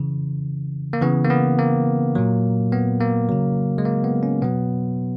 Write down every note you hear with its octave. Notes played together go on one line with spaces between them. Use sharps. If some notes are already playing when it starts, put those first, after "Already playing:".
Already playing: C#3 E3
A#3
C#3 E3 B3
A#3
B3
A#3
A#2 F#3
B3
A#3
C#3 F#3
G#3
A#3
B3
C#4
B2 F#3 B3